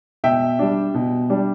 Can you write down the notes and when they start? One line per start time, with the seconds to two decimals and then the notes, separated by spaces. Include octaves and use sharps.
0.24 B2 E5 G5
0.59 G3 D4
0.94 B2
1.30 G3 D4